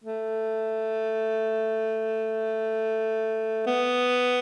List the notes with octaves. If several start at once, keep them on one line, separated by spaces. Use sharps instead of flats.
A3
B3